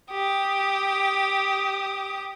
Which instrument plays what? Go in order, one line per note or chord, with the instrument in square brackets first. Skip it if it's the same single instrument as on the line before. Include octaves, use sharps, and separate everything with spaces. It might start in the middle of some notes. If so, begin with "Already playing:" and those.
[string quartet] G4 D#6